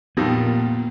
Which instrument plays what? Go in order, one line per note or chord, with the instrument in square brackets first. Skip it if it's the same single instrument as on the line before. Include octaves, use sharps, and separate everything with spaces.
[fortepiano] F2 D#3 G3 [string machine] A#2 A#3 [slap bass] B3